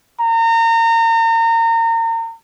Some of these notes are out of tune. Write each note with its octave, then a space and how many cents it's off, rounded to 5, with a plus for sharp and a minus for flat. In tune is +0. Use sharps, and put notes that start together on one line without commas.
A#5 -30